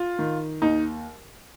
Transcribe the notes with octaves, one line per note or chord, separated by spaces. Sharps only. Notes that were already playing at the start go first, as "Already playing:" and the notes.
Already playing: F4
D#3
D#2 D#4